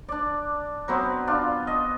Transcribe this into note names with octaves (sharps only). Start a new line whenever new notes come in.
D4 D5
F#3 B3 C4
D4 F4
D#5